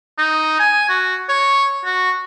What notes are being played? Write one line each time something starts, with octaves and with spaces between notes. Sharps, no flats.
D#4
G#5
F#4
C#5
F#4